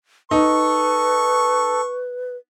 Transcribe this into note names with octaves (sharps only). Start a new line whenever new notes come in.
D#4 A4 B4 C#6